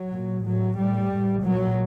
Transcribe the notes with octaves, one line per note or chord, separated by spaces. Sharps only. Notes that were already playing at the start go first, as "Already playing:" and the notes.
Already playing: F#3
A#2
A2 F#3
A2 G3
A2
A#2 F#3